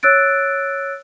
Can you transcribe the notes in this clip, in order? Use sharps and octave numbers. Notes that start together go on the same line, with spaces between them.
C#5 E6 F#6 A6 D7